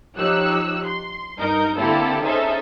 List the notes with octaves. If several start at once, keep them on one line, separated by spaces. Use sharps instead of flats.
F3 D#4 G4 C#5 E6 F#6
C6
G2 D#4 A#4 G6
D3 A#3 C4 E4 G4 A4
C#4 D#4 G#4 A4 C5 E5